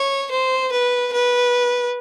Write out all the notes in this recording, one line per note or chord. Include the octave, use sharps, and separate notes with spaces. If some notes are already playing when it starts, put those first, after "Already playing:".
Already playing: C#5
C5
B4
B4